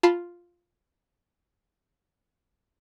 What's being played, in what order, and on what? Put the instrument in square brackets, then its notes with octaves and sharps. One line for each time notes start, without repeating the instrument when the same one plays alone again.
[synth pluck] F4 A5 B5 C6